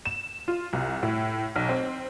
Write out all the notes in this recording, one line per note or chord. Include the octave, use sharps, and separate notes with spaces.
E7
F4
C2
A2
B1
C4